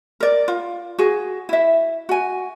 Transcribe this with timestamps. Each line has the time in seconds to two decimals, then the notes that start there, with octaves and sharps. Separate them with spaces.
0.20 A#4 D5
0.48 F4
0.99 F#4 G#4
1.49 E4 E5
2.09 F#4 G#5